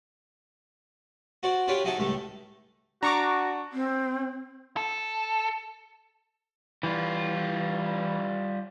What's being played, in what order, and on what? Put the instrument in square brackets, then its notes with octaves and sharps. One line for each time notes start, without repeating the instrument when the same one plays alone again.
[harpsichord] F#4 C5 D5
D4 F4 G4 B4 C#5 D5
F#3 D#4 E4 G#4 A4
C#2 A2 G3 A3
[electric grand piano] D4 [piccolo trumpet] F#4 [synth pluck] A#5 C#6 D6
[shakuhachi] C4
[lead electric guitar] A4
[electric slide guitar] E3 [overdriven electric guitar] G3 F4